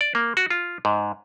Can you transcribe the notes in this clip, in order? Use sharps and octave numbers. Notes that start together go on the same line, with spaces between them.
D5
A#3
F#4
F4
G#2